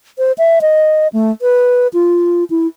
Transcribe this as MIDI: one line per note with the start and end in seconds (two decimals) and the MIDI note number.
0.18 0.32 72
0.38 0.59 76
0.61 1.08 75
1.13 1.32 57
1.42 1.87 71
1.93 2.44 65
2.50 2.67 64